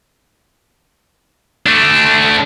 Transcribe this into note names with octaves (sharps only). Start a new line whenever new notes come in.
A3 D4